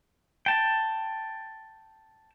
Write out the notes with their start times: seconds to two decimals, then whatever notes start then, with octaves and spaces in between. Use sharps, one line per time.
0.46 G5 A5